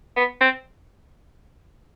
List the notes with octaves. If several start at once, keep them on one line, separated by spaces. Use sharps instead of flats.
B3
C4